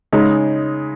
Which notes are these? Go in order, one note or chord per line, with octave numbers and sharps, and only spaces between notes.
C#3 G#3 D#4